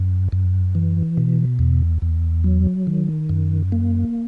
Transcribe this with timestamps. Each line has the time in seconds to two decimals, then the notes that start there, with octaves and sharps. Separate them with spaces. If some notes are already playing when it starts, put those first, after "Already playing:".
Already playing: F#2
0.32 F#2
0.75 E3
1.17 B2
1.59 E2
2.02 E2
2.44 F#3
2.87 D#3
3.29 F#2
3.72 A#3